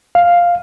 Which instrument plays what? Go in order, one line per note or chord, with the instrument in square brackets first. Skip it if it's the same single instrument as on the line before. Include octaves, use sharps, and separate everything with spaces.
[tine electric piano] F5